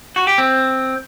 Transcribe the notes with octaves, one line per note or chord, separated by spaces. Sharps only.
F#4
G4
C4